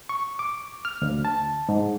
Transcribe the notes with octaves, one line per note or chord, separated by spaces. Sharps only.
C#6
D6
F6
D2
A5
G#2